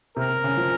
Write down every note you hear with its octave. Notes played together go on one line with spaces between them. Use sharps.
C3 A#4
C3
C#3
F3